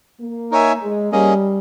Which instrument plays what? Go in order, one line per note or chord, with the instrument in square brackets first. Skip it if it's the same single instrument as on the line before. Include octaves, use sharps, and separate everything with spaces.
[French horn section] A#3
[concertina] D#4 A#4 C#5 E5 G#5
[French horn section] G#3
[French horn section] G3 [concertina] A#3 C#4 G#4 D#5